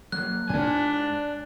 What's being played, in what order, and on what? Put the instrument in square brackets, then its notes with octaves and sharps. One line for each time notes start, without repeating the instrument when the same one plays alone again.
[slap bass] F#3 A#3 [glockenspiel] F#6
[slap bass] G#2 [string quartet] D4 [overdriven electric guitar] D5 G#5